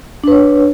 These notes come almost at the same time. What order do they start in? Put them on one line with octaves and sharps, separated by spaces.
D4 B4 C#5